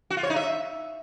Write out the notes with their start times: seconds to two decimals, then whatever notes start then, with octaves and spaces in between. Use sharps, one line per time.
0.10 F#4
0.17 F4
0.23 C#5
0.30 D#4
0.36 E5